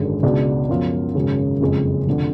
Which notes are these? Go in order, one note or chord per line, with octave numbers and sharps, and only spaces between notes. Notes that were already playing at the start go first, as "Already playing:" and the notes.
Already playing: G#1 F#2 D3 G#3
C#2 B2 G#3 D4 F#4
F#2 F3 B3 F4
G#1 F#2 C#3
F#1 F2 C#3 G#3
F1 F2 D3